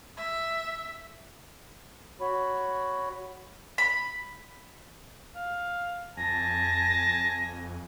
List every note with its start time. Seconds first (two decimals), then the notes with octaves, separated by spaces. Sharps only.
0.17 E5
2.20 F#4 C#5 B5
3.78 B5
5.35 F5
6.17 F2 G#5 A5 A#6